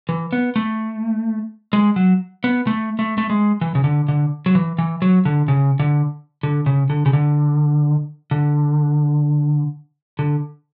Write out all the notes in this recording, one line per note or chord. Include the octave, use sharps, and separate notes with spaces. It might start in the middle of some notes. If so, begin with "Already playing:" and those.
E3
B3
A3
G#3
F#3
B3
A3
A3
A3
G#3
E3
C#3
D3
D3
F#3
E3
E3
F#3
D3
C#3
D3
D3
C#3
D3
C#3
D3
D3
D3